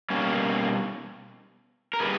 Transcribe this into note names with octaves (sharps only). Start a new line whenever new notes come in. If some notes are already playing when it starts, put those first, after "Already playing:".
B2 G3 A#3 C#4
A#4
G3 G#4 B4